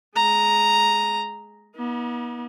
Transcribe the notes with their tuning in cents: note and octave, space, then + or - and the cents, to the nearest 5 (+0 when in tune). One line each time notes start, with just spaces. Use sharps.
G#3 +15 A#5 +0
B3 -40 D#4 +40